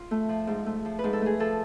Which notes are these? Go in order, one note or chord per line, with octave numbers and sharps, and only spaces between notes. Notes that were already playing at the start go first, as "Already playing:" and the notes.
Already playing: F4
A3
F3
G#2
A3
F3
B4
G#2
A4
A3 G#4
F3 A4